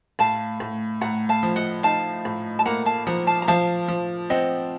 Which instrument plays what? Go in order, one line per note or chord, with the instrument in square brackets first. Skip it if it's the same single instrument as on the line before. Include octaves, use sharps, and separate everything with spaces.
[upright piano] A2 [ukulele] F5 A5
[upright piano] A2
[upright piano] A2 [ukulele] F#5 A#5
[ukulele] F5 A5
[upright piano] F3
[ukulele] D#5 F#5
[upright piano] D#4 [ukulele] F5 A5
[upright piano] A2
[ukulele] A5
[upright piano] A#3 [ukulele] F#5 A#5
[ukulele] F5 A5
[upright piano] F3 [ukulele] F#5 A#5
[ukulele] F5 A5
A#5
[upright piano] F3 [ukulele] F5 A5
[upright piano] F3
[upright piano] C4 [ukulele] D#5 F#5